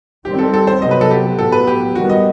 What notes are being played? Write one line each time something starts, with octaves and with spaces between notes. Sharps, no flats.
D#3 G3 C4 G4
A4
A4
C5
C3 F#3 B3 D#5
B4
A4
G4
A2 F#3 B3 A4
B4
G4
D#3 G3 B3 F#4
D#5